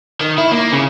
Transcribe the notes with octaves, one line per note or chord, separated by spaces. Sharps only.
D#3
E4
A#3
C#3